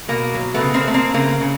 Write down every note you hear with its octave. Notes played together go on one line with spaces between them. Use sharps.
B2 A#3
F#3
A3 B3
C#3
A#3 C4
A3
A#3 C4
C#3 A#3
C#3